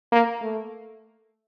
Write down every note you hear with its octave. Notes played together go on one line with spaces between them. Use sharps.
A#3
A3